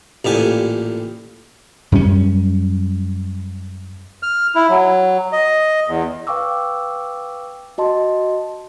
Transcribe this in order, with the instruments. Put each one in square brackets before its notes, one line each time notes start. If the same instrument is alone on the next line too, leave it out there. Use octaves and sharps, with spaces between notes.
[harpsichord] A1 A#2 G4 G#5
[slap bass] F#2 G3 C4 C#4
[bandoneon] F6
E4
F#3
D#5
E2
[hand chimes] B4 F5 G5 C#6 D6 E6
F#4 D#5 A5 C6